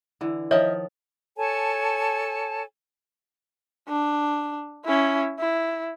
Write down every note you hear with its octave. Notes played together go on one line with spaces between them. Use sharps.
D3 E3
D#3 F3 C#5 D#5 E5
A4 C#5 G#5 A5
D4
C#4 E4
E4